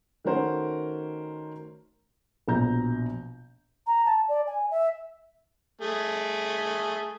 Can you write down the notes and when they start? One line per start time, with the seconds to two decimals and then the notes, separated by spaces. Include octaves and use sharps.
0.25 D#3 A3 C#4 F#4 A#4 C5
2.48 A#1 B2 A#5 G6
3.87 A#5
4.05 A5
4.28 D5
4.47 G#5
4.71 E5
5.81 A3 G#4